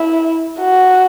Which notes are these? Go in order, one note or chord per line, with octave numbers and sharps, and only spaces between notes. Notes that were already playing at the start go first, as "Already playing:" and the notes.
Already playing: E4
F#4